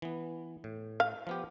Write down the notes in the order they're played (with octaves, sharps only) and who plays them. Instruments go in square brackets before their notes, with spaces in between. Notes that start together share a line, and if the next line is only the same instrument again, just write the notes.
[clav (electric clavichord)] E3 B3
A2
[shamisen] F5
[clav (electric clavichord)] F3 B3 G4